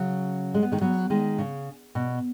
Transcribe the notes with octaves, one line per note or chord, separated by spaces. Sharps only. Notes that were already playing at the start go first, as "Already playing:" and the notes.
Already playing: C#3 F#3
G#3
B3
D#3 G#3
F#3 B3
D#3 G#3
C#3
B2